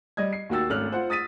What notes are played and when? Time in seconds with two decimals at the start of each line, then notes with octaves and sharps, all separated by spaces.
0.17 G3 D#5 G#6
0.33 C7
0.50 D#2 A#3 F#4 G5 E6 A6
0.70 G#1 A3 C#4 F6 F#6 F#7
0.92 F4 C5 F#5
1.10 D#6 A6 B6 D#7